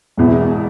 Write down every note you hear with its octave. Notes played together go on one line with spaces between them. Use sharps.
E1 E2 B2 B3 E4